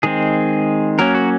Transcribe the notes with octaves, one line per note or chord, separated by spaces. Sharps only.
D#3 G#3 C4 G#4
F#3 A#3 C#4 A#4
F#4